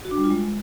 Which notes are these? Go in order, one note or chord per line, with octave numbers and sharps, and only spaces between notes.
F#4
D4
G3
F4
G#3